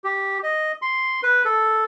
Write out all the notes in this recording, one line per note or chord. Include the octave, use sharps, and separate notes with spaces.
G4
D#5
C6
B4
A4